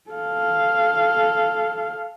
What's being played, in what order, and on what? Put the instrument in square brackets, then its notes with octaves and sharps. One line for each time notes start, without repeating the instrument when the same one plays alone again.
[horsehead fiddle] A4 F5